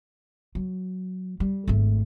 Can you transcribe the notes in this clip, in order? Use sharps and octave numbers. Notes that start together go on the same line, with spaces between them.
F#3
G3
G#1 A3